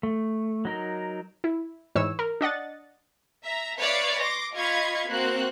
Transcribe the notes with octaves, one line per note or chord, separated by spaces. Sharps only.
A3
F#3 D#4 A#4
E4
G#2 E3 C#5 E6
A#4
D4 D#5 F#5 A6
E5 A#5
B4 C#5 D5 E5 F5
C6 D6 A#6
F4 D#5 F5 B5 C#6 G#6
A#3 C4 F#4 F#6